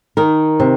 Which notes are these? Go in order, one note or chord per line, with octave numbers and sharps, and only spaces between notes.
D#3 A#4
C3